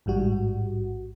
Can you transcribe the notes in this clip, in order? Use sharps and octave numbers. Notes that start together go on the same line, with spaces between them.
A1 G#2 G3 F#4